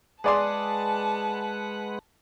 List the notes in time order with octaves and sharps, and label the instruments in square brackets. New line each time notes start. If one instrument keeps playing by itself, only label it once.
[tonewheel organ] G#3 B4 F#5 [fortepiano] G#4 D5 C6 [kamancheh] A5